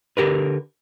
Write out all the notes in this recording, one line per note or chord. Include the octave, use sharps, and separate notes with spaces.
D3 G4 A#4 B4